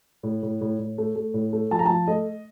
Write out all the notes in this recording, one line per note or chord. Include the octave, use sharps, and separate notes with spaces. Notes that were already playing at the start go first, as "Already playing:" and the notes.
A2
A2
A2
A2
A3
A3
A2
A3
F3 A5
A#5
F3 A5
A3 D#5